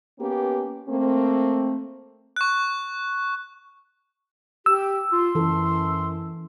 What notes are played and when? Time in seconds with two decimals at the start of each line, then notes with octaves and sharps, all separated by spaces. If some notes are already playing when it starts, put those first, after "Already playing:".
0.19 A#3 B3 C#4 G4
0.88 A3 A#3 C4
2.36 C#6 F#6
4.66 G4 E6
5.12 F4 C6
5.35 F#2 E3 A4